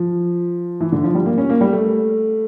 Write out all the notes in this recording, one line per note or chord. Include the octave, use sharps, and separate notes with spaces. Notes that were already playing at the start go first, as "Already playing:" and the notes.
Already playing: F3
E3
D3
F3
G3
A#3
C#4
A#3
G3
A3